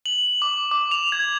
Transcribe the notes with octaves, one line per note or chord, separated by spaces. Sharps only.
F#7
D6
D6
F7
G#6